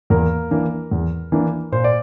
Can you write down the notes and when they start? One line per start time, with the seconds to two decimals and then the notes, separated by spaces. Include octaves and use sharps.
0.10 E2 A#3 A#4
0.51 E3 A#3 D4
0.91 E2
1.32 E3 A#3 D4
1.72 A#2 C5
1.84 D5